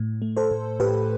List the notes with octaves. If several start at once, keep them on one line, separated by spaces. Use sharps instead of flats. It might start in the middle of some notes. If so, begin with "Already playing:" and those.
Already playing: A2
A3
A4 C5
A2
A2 G4 B4